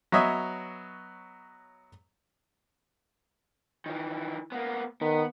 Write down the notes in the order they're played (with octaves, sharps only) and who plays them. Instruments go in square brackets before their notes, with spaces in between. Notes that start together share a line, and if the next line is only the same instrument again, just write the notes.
[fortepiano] F#3 B3 C#5 D#5 E5
[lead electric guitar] D#3 E3
A#3 B3
[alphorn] D#3 [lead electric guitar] B3